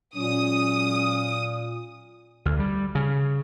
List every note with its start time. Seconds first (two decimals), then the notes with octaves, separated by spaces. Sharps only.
0.16 A#2 F#3 G#3 C#4 D#6
2.45 D2
2.59 G3
2.95 C#3